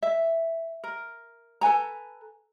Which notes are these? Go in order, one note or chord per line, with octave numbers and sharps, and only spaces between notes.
E5
A#4
A4 B4 G#5 A#5